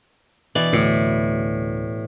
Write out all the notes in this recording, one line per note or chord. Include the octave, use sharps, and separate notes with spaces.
B2 E3 D5
D2 A2